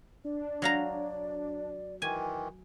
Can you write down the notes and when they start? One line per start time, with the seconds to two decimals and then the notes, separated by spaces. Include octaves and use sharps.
0.25 D4 D5
0.62 F#3 F5 A#5
2.02 D#3 E3 G#5